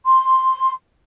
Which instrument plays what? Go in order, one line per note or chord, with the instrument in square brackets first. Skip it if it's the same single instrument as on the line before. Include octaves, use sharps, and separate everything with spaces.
[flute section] C6